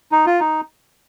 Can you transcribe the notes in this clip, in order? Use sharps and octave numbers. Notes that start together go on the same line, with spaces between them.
D#4
F4
D#4